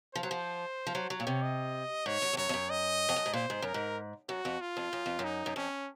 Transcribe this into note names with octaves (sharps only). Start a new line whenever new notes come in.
F3 C5
F#3
F3
F3
F#3
F#3 C#5
A#2
C3
D#5
G#2 C#5
F#2
F2
F#2 C#5
F2
F#2
D#5
F2
F#2
G#2
A#2 C5
G#2
F#2 A#4
G#2
F#2 F#4
F2
F4
F2
F#2
F2
F#2
D#4
F#2
F2 C#4